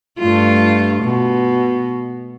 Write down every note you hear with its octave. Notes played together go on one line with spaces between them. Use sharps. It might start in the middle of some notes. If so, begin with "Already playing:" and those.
G2 A3 F4
B2